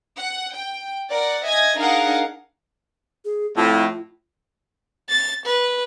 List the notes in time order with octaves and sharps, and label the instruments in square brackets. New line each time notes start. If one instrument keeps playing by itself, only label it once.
[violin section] F#5
G5
A#4 D5 F#5
D#5 E5 G#5 G#6 A#6
D4 D#4 G#4 A#4 F5 F#5
[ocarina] G#4
[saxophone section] F2 A2 [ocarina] F4
[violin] A6
B4